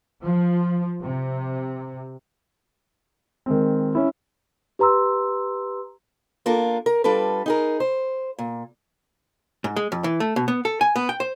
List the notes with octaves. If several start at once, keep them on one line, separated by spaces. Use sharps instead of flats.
F3
C3
D#3 G#3 C4
C#4 E4
G4 B4 A#5 C6 E6
A#3 D4 F4 A4 A#4
A#4
G3 D4 F4 A4 B4
D#4 G#4 A#4
C5
A#2
G#2
G#3
F2
E3
A3
B2
B3
A4
G#5
B3
G5
C5